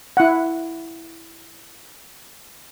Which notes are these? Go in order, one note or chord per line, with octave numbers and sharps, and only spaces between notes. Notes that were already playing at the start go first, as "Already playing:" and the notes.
E4 F#5